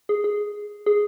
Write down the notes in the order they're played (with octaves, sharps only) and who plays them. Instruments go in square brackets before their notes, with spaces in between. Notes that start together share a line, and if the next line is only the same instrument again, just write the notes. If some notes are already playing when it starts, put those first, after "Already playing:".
[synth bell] G#4
G#4
G#4